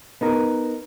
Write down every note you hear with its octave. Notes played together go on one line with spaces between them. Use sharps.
B3 D#4 A#4